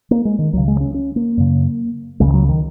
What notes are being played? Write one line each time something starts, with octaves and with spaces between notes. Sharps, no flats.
A#3
G#3
D#3
C#2 C#3 F#3
G#3
C#4
C#4
A#3
F#2 C#3
C#2 C#3 G#3
D#3
F#3
D#3